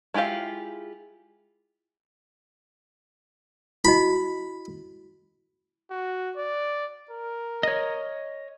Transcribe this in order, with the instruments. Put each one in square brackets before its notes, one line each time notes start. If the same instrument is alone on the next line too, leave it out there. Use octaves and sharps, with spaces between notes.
[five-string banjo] G#3 E4 F4 G4 F5
[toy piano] E4 F#4 D#5 [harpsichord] B5
[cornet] F#4
D5
A#4
[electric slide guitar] C#5 D#5